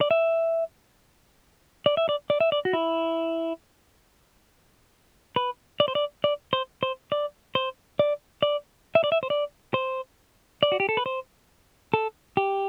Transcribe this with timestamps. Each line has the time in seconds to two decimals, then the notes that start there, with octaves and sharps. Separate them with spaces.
0.01 D5
0.11 E5
1.86 D5
1.97 E5
2.09 D5
2.30 D5
2.40 E5
2.52 D5
2.65 F#4
2.73 E4
5.36 B4
5.80 D5
5.88 C5
5.95 D5
6.24 D5
6.53 C5
6.83 C5
7.12 D5
7.55 C5
7.99 D5
8.42 D5
8.95 E5
9.04 D5
9.12 E5
9.23 C5
9.30 D5
9.74 C5
10.63 D5
10.72 F#4
10.80 G4
10.89 A4
10.97 B4
11.06 C5
11.94 A4
12.37 G4